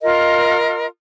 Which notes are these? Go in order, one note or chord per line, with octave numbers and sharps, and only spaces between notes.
F4 A#4 D#5